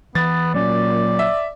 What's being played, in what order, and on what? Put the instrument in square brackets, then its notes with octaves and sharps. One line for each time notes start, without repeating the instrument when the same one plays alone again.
[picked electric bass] E3 [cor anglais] B3 [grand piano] A6
[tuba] A#2 [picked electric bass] F#3 C#4 [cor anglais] D5
[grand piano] E5